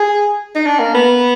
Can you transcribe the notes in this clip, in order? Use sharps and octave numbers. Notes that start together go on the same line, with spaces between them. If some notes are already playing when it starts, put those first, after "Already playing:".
Already playing: G#4
D#4
D4
A#3
B3